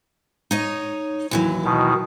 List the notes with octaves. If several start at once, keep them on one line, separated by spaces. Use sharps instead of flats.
D#4 C#5 D#5
D#2 E3 F#3
B2 D#3